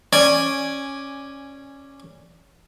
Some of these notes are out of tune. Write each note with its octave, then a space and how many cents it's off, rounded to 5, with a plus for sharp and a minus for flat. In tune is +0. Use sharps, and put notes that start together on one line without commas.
C#4 -10 D5 +0 G#5 +0